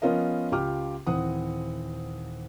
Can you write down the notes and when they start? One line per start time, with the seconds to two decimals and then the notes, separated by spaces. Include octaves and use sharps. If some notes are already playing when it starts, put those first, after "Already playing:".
0.02 F3 B3 C#4 F4 A#4 D#5
0.52 C#2 F4 G4 G5 D6 F6
1.07 D#1 E3 C4 F#5 D#6